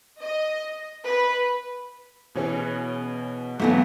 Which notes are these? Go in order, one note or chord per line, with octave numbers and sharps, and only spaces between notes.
D#5
B4
B2 E3 C#4 G#4
B1 E2 E3 F#3 A3 B3 C#4